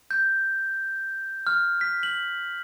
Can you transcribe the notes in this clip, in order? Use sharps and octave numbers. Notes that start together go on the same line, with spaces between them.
G6
F6
B6
F#7